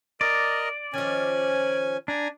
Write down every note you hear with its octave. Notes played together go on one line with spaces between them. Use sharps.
A#4 D5 D#5
D#3 F3 C#4 G#5
D4 G#5 A#5